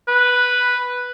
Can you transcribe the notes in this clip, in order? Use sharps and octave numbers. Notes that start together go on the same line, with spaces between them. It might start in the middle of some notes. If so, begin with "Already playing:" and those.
B4